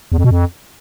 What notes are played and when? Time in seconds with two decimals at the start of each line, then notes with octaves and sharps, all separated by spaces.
0.12 E2
0.18 F2
0.24 B2
0.31 F2